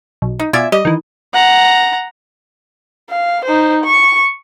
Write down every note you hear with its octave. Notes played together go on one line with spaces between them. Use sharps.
B1
D#4
B2 F4 D5 E5 G#5
G3 D#5
D#3 E3
F#5 A#5
F5
D#4 C5
C#6